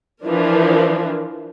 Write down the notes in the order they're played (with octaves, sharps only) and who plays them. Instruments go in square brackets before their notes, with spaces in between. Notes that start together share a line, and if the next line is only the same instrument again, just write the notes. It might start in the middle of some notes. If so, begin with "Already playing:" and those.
[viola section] E3 F3 D4 A#4